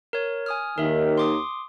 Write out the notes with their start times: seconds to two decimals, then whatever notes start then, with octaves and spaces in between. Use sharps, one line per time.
0.13 A#4 C#5
0.46 G#5 D#6 F6
0.78 D#2 D#3 A#4 E5
1.17 C6 D6 D#6